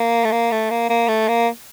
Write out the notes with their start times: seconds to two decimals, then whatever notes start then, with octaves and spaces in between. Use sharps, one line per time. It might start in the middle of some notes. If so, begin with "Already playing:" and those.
Already playing: A#3
0.24 A3
0.32 A#3
0.51 A3
0.70 A#3
0.90 A#3
1.08 A3
1.28 A#3